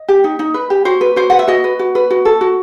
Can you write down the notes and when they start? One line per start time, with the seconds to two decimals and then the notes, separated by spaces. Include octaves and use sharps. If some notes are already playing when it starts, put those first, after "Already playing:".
Already playing: D#5
0.08 G4
0.24 D#4
0.39 D#4
0.54 B4
0.70 G4
0.85 F#4 C5
1.01 B4
1.16 F#4 C5
1.30 B4 F#5
1.39 E5
1.48 F#4 D#5
1.64 B4
1.79 F#4
1.95 B4
2.10 F#4
2.25 A4
2.41 F#4